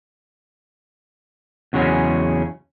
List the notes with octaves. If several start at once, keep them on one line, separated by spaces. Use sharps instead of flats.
E2 C#3 F#3 G#3 C#4